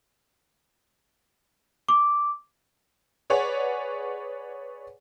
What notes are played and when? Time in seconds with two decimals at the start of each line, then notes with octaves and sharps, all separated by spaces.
1.89 D6
3.30 G#4 B4 C#5 D5 F#5 G#5